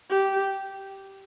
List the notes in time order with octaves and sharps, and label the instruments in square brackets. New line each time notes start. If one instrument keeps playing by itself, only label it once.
[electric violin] G4